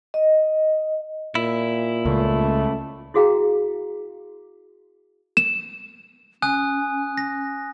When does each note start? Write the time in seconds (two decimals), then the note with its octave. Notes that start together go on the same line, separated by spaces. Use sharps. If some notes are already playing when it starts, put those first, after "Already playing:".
0.14 D#5
1.35 A#2 E4
2.05 C#2 A3
3.14 E4 F#4 G#4 F5 G5 A#5
5.37 E7
6.42 C#4 G#5 D#6 F#6
7.18 A#6